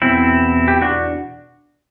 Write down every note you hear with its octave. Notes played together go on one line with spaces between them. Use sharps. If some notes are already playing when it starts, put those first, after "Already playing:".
E2 B2 C4 E4
G4
D4 F#4